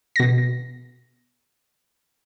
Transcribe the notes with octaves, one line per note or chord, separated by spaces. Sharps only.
B2 A#6